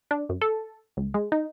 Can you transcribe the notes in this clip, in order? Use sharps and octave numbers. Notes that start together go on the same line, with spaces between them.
D4
F#2
A4
C#2
G#3
D#4